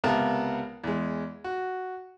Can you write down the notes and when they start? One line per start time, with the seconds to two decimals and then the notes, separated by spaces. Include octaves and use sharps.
0.04 C#2 C3 B3 A#4 F5 A5
0.84 E2 G#3
1.44 F#4